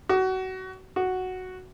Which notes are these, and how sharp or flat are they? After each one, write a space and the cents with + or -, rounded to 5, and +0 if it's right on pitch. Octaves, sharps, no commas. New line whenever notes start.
F#4 +25
F#4 +0